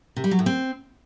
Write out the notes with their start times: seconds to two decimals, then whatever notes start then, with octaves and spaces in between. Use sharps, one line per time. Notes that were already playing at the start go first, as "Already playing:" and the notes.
0.16 C3
0.24 G3
0.31 F#3
0.39 A2
0.46 C4